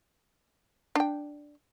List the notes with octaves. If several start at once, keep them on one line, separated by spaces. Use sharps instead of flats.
D4 G5